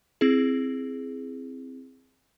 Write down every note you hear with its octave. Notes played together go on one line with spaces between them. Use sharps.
C4 E4 G#4